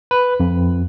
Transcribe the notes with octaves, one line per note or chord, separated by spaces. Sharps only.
B4
F2